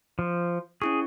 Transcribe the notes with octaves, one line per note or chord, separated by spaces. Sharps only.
F3
C#4 E4 G#4 C#6